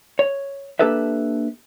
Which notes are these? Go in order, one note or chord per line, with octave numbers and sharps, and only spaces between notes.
C#5
A#3 D4 G4 A4 B4 E5